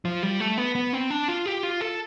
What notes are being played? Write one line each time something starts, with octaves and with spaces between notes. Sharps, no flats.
F3
G3
A3
B3
B3
C4
D4
F4
G4
F4
A4